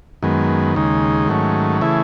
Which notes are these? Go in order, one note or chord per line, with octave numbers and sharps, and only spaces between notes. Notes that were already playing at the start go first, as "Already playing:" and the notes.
F#2 D#3 G#3 B3
D#2 C#3 G#3 D#4
G#2 D#3 F#3 A3 C#4
C#3 E3 A3 E4 G#4